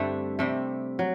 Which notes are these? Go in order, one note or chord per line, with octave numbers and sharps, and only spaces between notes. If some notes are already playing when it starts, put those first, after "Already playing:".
Already playing: G2 D3 G3 A3 C4 D4
C3 G3 A3
F#3